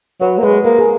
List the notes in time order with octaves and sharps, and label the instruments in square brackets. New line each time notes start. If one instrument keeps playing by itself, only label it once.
[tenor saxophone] F#3 [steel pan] B4
[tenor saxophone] A#3
[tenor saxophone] G#3 [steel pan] B4
[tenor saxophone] A#3 [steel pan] A#4
[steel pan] G#4